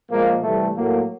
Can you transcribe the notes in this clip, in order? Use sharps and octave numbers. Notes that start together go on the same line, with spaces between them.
A#2 F3 G#3 A#3
C3 E3 G3 A3
A2 F#3 A3 A#3